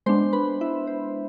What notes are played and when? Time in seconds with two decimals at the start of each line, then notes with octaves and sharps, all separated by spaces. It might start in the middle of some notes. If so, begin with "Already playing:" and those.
0.06 G#3 B3 D4 C5 C6
0.33 B4 B5
0.61 E4 E5
0.87 C5